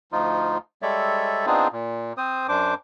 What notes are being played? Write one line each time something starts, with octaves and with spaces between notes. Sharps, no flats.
D2 F3 D#4 F4
G3 G#3 A4 C#5 D5 E5
B3 C4 D4 D#4 F4 G#4
A#2
C4 C5 D#6
F#2 D4 C5 D6